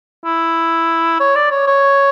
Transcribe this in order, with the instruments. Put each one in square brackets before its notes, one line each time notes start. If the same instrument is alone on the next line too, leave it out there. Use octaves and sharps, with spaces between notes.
[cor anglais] E4
C#5
D5
C#5
C#5